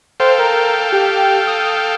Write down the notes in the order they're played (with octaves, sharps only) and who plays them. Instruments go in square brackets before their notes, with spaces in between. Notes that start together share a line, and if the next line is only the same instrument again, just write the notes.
[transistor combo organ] A4 F5 G5 [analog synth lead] C5
[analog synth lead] A#4
G4
D#6